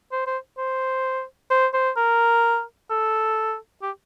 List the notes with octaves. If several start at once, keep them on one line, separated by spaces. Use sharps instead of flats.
C5
C5
C5
C5
C5
A#4
A4
G4